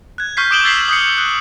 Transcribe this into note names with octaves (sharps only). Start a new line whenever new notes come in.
F#6 G#6
C#6 F6 G6 B6 C7
D6 D#6 D7 E7 F#7 G7
E6 G#6 A6 B6 C7 F#7
D#6 G6 C7 C#7
F#6